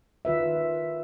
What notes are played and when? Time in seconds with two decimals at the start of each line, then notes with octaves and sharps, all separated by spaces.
0.25 D#3 F4 B4 E5